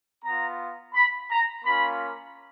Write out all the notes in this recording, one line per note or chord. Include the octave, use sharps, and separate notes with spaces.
B3 F4 A#5
B5
A#5
A#3 C#4 F4 B5